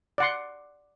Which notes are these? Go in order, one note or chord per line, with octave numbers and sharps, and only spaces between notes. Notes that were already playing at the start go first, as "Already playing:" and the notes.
D5 F#5 C6